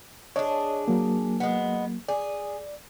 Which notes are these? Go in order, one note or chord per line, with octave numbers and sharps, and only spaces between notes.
D4 G#4 C#5 D#5
F#3 A#3
G#3 B3
G#4 D5